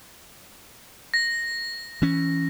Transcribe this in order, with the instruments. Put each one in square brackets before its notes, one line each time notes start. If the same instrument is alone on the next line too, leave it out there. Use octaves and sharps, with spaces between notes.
[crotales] A#6
[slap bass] E3 C#4